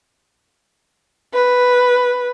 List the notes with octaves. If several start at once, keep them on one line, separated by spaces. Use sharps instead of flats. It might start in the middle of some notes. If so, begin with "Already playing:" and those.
B4